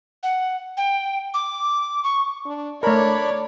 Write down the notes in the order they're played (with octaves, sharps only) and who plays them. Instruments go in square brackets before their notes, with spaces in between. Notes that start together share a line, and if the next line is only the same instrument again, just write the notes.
[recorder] F#5
G5
D6
C#6
[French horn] D4
[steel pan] A3 A#4 [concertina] D4 B5 [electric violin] C#5 [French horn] D5